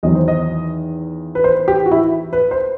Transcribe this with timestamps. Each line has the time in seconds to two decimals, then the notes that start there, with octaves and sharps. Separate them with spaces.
0.03 E2 D#3 F#3 D#5
0.15 C5
0.28 D#5
1.35 B4
1.44 C5
1.68 G4
1.86 F#4
1.91 E4
2.33 B4
2.51 C5